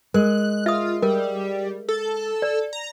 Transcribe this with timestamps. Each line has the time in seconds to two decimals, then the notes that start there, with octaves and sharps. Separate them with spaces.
0.14 G#3 A#4 F#6
0.66 F4 E5 D#6
1.02 G3 A#4
1.89 A4
2.42 D5
2.73 A#5